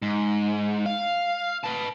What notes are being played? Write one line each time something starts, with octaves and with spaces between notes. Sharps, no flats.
G#2
F5
B4 A5